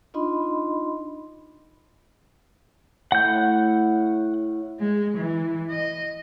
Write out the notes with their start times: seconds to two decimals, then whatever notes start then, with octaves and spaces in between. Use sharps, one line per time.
0.14 D4 D#4 F4 D#5 B5 C6
3.12 A2 F#5 G6
4.80 G#3
5.17 E3
5.70 D#5